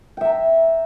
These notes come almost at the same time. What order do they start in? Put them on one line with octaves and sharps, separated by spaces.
G5 E5 A#5